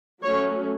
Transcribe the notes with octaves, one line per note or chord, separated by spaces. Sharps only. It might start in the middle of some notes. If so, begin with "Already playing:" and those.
F#3 A3 C#4 C#5